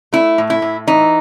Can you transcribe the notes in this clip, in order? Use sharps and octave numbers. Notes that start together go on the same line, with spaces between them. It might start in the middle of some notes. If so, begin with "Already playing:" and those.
A3 E4
A2
E4
A2
E3 D#4